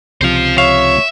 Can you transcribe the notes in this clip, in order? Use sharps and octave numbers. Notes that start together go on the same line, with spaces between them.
C#2 C3 F3 C5 F5
C#5 E5 F5